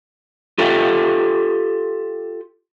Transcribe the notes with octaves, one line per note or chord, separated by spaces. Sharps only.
F4 G4 A4 E5 G5